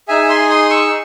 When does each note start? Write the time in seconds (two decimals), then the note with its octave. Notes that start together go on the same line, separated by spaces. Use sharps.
0.08 D#4 G#4 E5 G#5
0.30 G#5 C6
0.49 C6 D#6
0.70 C#6 E6